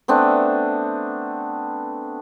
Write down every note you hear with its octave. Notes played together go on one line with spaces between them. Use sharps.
A3 B3 C4 D4